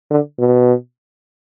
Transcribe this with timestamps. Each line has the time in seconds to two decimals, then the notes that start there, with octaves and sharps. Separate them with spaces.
0.10 D3
0.39 B2